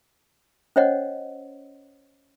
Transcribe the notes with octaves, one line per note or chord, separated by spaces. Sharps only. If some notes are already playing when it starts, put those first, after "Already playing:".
C#4 C5 C#5 D#5 F#5